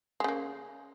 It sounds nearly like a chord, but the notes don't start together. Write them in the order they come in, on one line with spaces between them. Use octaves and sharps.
G#3 C#3 A#3